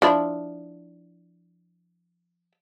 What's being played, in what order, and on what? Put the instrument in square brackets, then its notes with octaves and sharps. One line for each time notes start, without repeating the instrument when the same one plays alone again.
[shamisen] F3 D4 E4